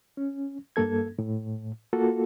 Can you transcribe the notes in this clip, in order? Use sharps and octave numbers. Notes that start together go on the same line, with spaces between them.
C#4
G2 A#3 A4 G#6
A2
A#3 F4 F#4 A4